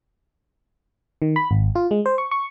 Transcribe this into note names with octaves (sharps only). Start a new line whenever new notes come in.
D#3
B5
G#1
F4
G#3
C5
C#6
C#6